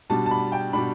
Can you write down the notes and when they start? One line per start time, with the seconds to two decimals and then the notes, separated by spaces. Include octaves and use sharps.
0.10 B2 G3 D4 A5
0.26 A5
0.31 B5
0.52 G5
0.73 B2 G3 D4 B5